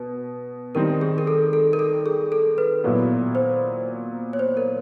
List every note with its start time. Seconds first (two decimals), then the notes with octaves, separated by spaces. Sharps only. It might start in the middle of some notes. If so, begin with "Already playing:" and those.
Already playing: B2 B4
0.75 D#3 G3 C4 D#4 A#4
1.01 G#4
1.18 A#4
1.27 A4
1.53 A4
1.73 A#4
1.79 A4
2.06 G#4
2.32 A4
2.58 B4
2.84 A#2 F#3 B3 E4
3.35 C5
4.33 C#5
4.39 C5
4.57 A#4